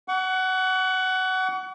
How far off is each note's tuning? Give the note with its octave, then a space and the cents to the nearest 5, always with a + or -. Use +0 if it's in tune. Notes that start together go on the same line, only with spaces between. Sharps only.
F#5 +15 C#6 +40